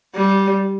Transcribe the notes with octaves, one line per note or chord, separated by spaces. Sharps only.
G3